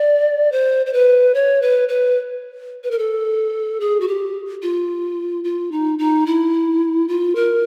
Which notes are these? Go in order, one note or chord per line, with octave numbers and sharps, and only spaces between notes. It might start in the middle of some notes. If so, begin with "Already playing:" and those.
Already playing: D5
C5
C5
B4
C#5
B4
B4
B4
A#4
A4
G#4
F#4
G4
F4
F4
D#4
D#4
E4
F4
A#4